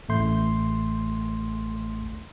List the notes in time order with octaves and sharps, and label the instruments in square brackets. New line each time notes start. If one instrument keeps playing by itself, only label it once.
[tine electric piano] A1 A3 C6 G6